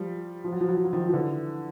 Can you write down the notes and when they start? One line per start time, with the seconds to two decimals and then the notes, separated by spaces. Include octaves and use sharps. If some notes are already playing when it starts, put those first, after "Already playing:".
Already playing: F3 G3
0.44 F3
0.52 F#3
0.60 F3
0.69 F#3
0.77 F3
0.85 F#3
0.93 D#3 F3
1.09 F3
1.13 D3 E3